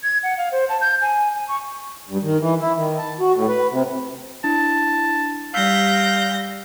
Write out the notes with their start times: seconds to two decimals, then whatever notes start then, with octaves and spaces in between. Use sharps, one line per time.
0.03 G#6
0.23 F#5
0.38 F5
0.52 C5
0.69 A5
0.81 G6
1.02 G#5
1.35 G#5
1.48 C#6
2.09 G2
2.23 D#3
2.40 E3
2.60 E4
2.77 D#3
2.98 A5
3.20 F#4
3.34 A2
3.48 B4
3.71 C3
4.44 D4 E4 A5
5.54 G3 F5 E6 G6 A#6 B6